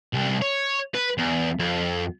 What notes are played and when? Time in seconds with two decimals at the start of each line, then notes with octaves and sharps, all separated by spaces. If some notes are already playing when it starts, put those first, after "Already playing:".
0.13 C2
0.42 C#5
0.94 B4
1.18 E2
1.59 F2